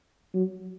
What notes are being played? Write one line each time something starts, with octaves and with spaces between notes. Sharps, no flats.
F#3